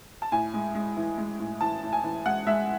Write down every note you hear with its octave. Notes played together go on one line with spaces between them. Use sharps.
A5
A2 G#5
G#3
G#3
E3
G#3
A2
E3 A5
A2
G#5
E3
G#3 F#5
G#3 E5